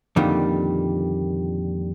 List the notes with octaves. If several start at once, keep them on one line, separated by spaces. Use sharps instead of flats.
F2 A#2 D3 D#3 G3